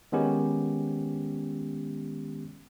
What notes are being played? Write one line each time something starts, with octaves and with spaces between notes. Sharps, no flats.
D#3 G#3 B3 C#4 G4